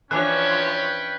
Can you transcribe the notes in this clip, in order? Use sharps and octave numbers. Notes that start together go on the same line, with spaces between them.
E3 F3 C#4 D4 B4 C#5 G5 F#6